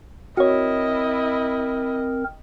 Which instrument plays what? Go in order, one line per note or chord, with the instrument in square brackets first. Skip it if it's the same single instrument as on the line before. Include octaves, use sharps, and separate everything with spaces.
[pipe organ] C4 A#4 [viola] E4 D#5 [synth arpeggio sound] F#4 C#5